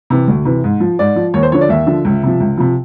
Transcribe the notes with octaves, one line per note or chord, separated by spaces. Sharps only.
C3 E3
D2
C3 E3
G#2
F3
G#2 D5
F3
D#2 C#5
C5
D3 F3 C#5
D5
D#2 E5
D3 F3
C#2
C3 F3
C#2
C3 F3